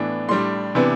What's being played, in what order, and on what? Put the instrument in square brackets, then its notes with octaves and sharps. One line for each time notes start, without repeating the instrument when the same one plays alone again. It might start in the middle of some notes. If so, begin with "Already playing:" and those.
Already playing: [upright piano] A2 E3 B3 D4
A2 G3 D4 C6
C3 E3 B3 D4